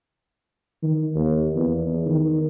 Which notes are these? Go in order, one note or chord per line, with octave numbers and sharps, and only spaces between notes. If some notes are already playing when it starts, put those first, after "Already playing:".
D#3
D#2
E2
D#3